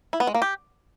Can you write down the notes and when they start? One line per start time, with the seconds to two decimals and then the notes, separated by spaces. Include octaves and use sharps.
0.13 E4
0.20 B3
0.27 G#3
0.35 A#3
0.42 G4